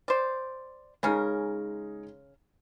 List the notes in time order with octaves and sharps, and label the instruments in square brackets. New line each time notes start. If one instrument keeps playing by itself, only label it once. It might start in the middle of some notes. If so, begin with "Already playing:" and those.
[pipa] C5 D5
[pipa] C#3 C#4 A#4 [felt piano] G#3 D#4 G#4